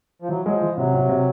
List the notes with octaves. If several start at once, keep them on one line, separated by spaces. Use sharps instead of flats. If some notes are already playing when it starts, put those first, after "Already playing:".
F3
E3 F#3
F#3 G#3
F3
E3
C3 F#3
C3
C3